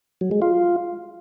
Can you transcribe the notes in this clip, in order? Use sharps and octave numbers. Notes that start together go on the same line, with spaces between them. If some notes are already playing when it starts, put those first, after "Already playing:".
F#3
G#3
F4